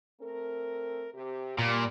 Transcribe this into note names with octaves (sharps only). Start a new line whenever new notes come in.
A3 C4 A#4
C3 G4
A#2 G3